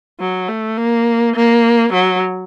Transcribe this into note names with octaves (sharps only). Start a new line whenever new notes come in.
F#3
A3
A#3
A#3
F#3